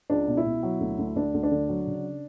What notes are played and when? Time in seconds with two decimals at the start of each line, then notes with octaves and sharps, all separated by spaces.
0.10 C#2 D4
0.28 B2
0.37 E4
0.46 B2
0.63 F#3
0.80 D2
0.99 D2
1.16 D2 D4
1.34 D2
1.43 D4
1.52 D3
1.69 F#3
1.87 C#3